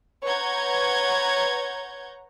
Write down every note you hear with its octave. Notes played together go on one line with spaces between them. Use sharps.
B4 C#5 F#5 A#5 G6 G#6